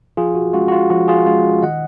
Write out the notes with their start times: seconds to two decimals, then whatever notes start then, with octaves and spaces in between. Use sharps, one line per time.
0.17 F3 F4 G#4
0.35 F#4
0.53 G#3 C#4 F4 F#4
0.68 F#4
0.72 F4
0.90 F3 F#4
1.08 F4 G#4
1.26 G#3 C#4 F4
1.62 D#3 D#5 F#5